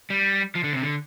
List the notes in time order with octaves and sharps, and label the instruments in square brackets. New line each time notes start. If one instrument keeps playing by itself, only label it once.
[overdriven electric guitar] G3
F3
D3
C3
D3